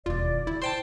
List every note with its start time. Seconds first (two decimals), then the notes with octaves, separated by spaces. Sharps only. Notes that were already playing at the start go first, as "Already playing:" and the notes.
0.06 E1 D#2 F4 D5
0.47 C#3 E4
0.62 C5 G5 A5